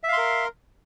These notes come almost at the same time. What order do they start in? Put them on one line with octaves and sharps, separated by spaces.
E5 F5 C6 A#4